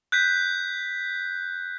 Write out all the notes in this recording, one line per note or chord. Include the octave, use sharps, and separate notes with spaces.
F#6 G6 B6